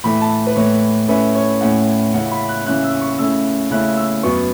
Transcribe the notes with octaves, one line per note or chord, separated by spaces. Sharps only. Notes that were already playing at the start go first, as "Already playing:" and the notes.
A2 E3 A3 B5
A5
B4
A2 E3 A3 C#5
A2 A3 C#4 E4 B4
C#5
A2 A3 C#4 E4 F#5
C#3 E3 C#4 E4 F#5
B5
F#6
C#3 E3 C#4 E4 F#6
E6
C#6
C#3 A3 C#4 E4 E6
C#3 A3 C#4 E4 F#6
E6
F#2 F#3 B3 C#6